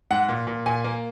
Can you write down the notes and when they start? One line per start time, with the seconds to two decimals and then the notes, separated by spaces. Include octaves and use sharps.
0.11 G#2 F#5
0.28 A#2
0.47 A#2
0.66 A#2 G#5
0.84 A#3